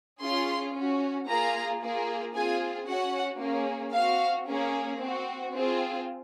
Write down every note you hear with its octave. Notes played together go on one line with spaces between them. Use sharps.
C#4 F4 G#4 C6
C#4 F#4
A#3 F4 G#4 A#5
A#3 F4 G#4
C4 F4 G#4 G#5
C#4 F#4 F#5
A#3 C#4 G#4
C4 F#4 F5
A#3 C#4 G#4
C4 F#4
C4 F4 G#4